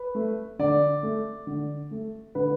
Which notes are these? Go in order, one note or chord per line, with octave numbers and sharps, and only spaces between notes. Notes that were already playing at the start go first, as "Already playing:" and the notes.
Already playing: B4
A3
D3 D5
A3
D3
A3
D3 B4